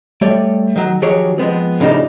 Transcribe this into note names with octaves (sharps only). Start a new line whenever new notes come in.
G3 A3 G4 C#5 D5
D#3 F#3
D#3 F3 F#3 G4 G#4 C#5
F3 G#3 B3 C4
A2 C#3 F3 D4 D#4 G4